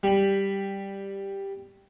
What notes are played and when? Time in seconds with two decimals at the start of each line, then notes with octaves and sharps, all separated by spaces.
0.03 G3 B5